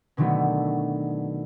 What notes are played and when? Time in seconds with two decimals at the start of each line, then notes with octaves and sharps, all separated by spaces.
0.17 B2 D3 D#3 F#3 A3 B3